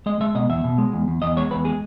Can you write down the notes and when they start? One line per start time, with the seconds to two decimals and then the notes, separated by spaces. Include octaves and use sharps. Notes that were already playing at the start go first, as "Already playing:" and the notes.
0.06 G#3 D#5
0.21 G#3 E5
0.35 B2 D#5
0.49 E2 E5
0.64 B2
0.78 G#3
0.93 E2
1.08 E2
1.22 E2 D#5
1.37 G#3 C#5
1.51 E2 B4
1.65 G#3 G#4